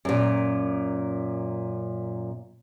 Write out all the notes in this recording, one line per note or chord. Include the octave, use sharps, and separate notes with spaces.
F#2 A#2